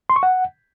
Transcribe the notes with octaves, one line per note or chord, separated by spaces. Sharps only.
C6
C#6
F#5